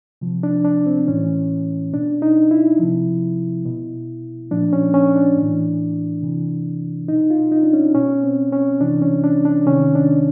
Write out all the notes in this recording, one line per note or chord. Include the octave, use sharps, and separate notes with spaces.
C3 F3
D4
D4
C4
A2 E3 C#4
B2 D4
D#4
E4
C3 F3
B2
A#2 F3 D4
C#4
C#4
D4
A2 E3
C3 E3
B2 D#4
F4
D#4
D4
C#4
B2 C#4
C4
C#4
C3 E3 D4
C#4
D4
D4
C3 D#3 C#4
D4